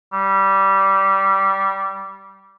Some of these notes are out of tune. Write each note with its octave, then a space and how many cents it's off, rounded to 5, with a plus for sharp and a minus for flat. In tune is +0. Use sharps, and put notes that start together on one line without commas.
G3 -15